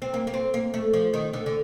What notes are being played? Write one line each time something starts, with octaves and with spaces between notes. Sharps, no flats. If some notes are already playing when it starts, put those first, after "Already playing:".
C4
A#3
A#3
C4
A#3
A3
F3
D#3
D3
D3